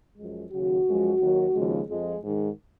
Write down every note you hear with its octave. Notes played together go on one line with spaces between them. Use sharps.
F#2 F3 G#3
D#2 C#3 F#3 F#4
F#2 F3 G#3
D#2 D#3 F#3
D#2 C#3 F3 G#3
F2 F3 G#3
G#2 D#3 G#3